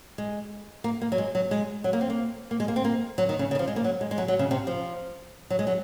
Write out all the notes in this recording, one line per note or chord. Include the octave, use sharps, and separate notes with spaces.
G#3
A#3
A#3
F#3
G#3
F#3
G#3
F#3
A#3
C4
A#3
A#3
G#3
A#3
C4
A#3
F#3
D#3
C#3
C#3
D#3
F3
G#3
A#3
F#3
G#3
G#3
F#3
F#3
C#3
C3
F3
F#3
G#3
F#3